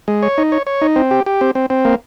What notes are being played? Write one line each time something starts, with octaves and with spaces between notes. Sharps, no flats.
G#3
C#5
D#4
C#5
C#5
D#4
C4
G4
G4
C4
C4
C4
A#3